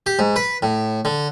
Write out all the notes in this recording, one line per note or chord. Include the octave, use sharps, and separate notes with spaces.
G4
G#2
B4
A2
D3